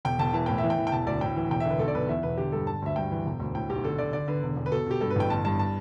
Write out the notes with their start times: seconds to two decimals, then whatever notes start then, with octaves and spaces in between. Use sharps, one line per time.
0.05 E1 G5
0.19 E1 A5
0.33 E3 A5
0.46 A2 G5
0.58 E5
0.64 E3
0.70 G5
0.78 E3
0.87 G5
0.92 E1 A5
1.07 D2 D5
1.21 A2 G5
1.36 E3
1.51 E1 G5
1.60 E5
1.65 D3 B4
1.79 B1 A4
1.88 D5
1.95 B1 B4
2.09 E2 E5
2.23 E1 B4
2.38 D3 G4
2.52 G2 A4
2.67 D3 A5
2.82 D2 E5
2.96 G2 G5
3.11 E3
3.26 E1
3.40 D2
3.55 A2 G5
3.70 B1 G4
3.83 D3 A4
3.98 D3 D5
4.13 D3 D5
4.28 D3 B4
4.43 E1
4.56 E1
4.66 B4
4.72 B2 A4
4.86 B2 G4
5.01 G2 A4
5.10 B4
5.16 A1 G5
5.30 G1 A5
5.45 G2 A5
5.59 A5